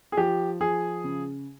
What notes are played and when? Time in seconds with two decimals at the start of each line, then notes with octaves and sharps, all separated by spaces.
0.12 G#4
0.17 F3 G4
0.61 F3 G#4
1.04 C#3